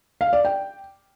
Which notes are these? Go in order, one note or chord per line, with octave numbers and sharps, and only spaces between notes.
F5
D5
G5